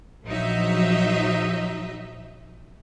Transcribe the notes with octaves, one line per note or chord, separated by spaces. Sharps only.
A#1 F3 F#3 D#4 D#5 E5